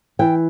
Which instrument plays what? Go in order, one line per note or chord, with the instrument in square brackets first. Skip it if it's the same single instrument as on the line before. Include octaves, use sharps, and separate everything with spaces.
[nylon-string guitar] E3 G5